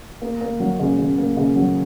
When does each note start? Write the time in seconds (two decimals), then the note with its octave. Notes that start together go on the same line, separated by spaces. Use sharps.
0.22 A#3
0.41 A#3
0.60 F#3
0.80 C#3
0.99 C#3
1.18 A#3
1.37 C#3
1.56 F#3